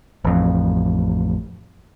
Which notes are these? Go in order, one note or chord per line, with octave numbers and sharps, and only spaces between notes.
A1 F2